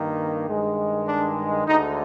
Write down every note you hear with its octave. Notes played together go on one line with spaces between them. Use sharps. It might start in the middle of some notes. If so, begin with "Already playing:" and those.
Already playing: G2 D#3 A#3
G2 D#3 G#3
D4
D2 D3 G#3 D#4